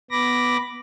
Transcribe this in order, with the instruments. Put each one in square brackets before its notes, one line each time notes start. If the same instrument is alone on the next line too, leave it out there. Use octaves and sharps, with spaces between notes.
[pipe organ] B3 B5 D6 A#6